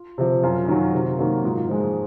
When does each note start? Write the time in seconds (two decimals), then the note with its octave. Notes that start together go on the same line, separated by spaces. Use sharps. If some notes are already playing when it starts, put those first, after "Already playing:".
Already playing: F4
0.18 C3 F3
0.43 F#2 F4
0.68 D#3 F#3
0.94 C3
1.19 D#3 F#3 A#3
1.44 G#2 F4
1.69 F3 G#3